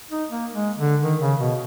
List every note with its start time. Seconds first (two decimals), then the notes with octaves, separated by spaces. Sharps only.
0.11 D#4
0.29 A#3
0.53 G#3
0.78 D3
1.03 D#3
1.21 C#3
1.39 B2